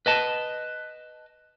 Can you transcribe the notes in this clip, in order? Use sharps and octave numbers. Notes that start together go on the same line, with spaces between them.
B4 D#5 A5